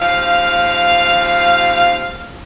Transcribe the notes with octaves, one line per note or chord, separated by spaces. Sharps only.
D#2 F3 F5